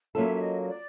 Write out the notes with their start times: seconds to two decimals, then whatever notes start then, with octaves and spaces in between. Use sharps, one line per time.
0.15 F#3 A#3 C#4 F4 A4 E5
0.35 E5
0.41 D#5
0.61 D#5
0.67 D5